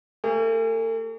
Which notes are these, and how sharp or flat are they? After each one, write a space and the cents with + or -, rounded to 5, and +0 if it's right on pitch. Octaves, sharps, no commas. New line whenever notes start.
A3 +45 G#4 -20